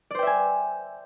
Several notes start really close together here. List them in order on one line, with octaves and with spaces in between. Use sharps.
D5 C5 G5 E5 G#5